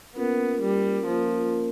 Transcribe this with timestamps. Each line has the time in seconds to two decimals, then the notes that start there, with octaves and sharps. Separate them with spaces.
0.16 A#3 B3 C#4 F4 A#4
0.61 G3
1.07 F3 A#3 C#4 F4 A#4